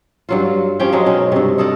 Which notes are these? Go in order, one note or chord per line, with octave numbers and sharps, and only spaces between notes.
G2 F#3 F4
F3 C#4 G4 G5
F#3 G#3 D#4
B2 C#4
G2 C3
D#4 A4 A#4 D5